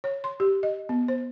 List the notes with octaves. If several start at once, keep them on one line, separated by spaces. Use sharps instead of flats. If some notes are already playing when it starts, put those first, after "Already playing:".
C#5
C6
G4
D#5
B3
C5